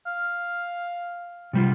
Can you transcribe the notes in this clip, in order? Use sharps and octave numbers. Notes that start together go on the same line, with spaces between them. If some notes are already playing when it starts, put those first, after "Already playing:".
F5
C3 G3 F4